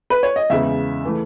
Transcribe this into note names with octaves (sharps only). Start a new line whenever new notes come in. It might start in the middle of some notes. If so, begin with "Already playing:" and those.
B4
C#5
D#5
E2 C#3 G#3 E5
E3 A3